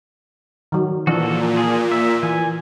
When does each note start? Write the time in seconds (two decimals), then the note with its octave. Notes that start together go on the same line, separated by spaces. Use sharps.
0.72 D#3 F#3
1.07 A#2 E3 F3 D4 F#4 A4
1.57 G#4
1.92 E5
2.23 E3 G#5